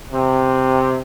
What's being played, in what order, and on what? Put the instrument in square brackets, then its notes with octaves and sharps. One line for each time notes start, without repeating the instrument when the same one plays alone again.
[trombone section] C3